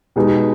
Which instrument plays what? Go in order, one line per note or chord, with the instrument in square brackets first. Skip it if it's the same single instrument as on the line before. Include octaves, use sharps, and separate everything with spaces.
[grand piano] B2 G#3 B3 D#4 G4